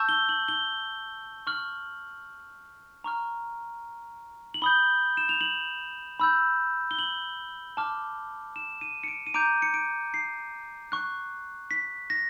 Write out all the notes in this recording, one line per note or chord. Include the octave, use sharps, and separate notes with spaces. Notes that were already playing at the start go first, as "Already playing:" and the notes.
Already playing: A5 C#6 E6 G6
G7
F#7
G7
C#6 F6 F#7
A#5 C#6 F6
F#7
B5 D#6 G6 G7
E7
F7
F#7
B5 E6 G6
G7
F#7
A5 D6 F6
E7
D#7
C#7
D7
D#7
A#5 D6 G6 D7
C#7
D7
C7
C#6 F#6
B6
A#6